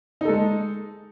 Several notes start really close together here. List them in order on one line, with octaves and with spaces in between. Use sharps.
D#4 A4 G#3